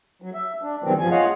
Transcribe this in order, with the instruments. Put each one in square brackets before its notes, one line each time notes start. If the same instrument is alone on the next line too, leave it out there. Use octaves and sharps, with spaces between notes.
[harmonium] F#3
E5
D4
C3 D#3 F#3 G3 B3 C4
G2 F3 G#5
F4 G#4 C#5 D#5 F5 F#5